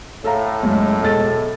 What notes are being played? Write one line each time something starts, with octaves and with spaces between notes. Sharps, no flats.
A2 A4 F5 A#5
C#2 F#2 G#3 A3
E1 A4 D#5 A6